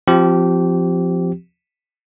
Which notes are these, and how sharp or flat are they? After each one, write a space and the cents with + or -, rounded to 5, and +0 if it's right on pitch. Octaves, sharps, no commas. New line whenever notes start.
F3 +0 C4 +0 G4 -20